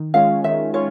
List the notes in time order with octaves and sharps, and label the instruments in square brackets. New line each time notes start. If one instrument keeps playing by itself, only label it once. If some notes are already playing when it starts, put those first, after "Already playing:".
Already playing: [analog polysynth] D#3
[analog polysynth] G#3 C#4 F4 [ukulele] F5
[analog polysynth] D#3 [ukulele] E5
[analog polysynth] C#4 F4 [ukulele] C#5